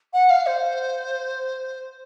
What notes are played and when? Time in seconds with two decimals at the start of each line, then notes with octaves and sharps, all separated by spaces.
0.13 F#5
0.30 F5
0.46 C5